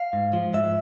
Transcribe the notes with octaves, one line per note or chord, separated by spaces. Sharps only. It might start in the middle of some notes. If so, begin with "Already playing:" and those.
Already playing: F5
G#2
F3
G#2 E5